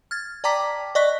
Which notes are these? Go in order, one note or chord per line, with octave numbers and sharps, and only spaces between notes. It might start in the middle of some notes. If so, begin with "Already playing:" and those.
F6 G#6 A6
D5 G5 A5 A#5 D6 B6
D5 D#5 C#6 F#6 B6